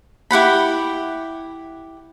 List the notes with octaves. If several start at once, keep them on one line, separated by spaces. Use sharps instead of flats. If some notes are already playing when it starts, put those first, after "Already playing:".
E4 G4 F#5 B5